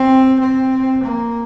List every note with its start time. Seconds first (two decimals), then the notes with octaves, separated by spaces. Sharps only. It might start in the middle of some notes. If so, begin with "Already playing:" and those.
Already playing: C4
0.40 C4
1.04 A#3